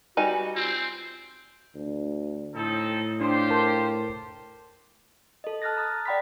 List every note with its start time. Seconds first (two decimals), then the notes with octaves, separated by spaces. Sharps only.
0.17 G3 D#4 F#4 B4 G#5
0.56 C4 F4
1.75 D2
2.55 A2 C4 D#4 A4
3.21 D4 F4 G4 C5
3.50 A#4 A5 C6
5.44 A4 D#5
5.62 A5 F6 F#6 A6 A#6
5.77 A#5 D#6 A6
6.05 D5 F#5 G5 B5 C6 B6